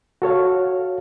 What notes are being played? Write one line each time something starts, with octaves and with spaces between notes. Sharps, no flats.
F#4 A4 C#5 F5